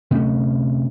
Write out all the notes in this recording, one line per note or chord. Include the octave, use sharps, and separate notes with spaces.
C3 A3 C#4